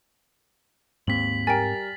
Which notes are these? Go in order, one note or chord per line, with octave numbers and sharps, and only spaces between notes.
D#2 G#2 C4 B6 F#7
G3 A#4 G5 G#5 A#5 A6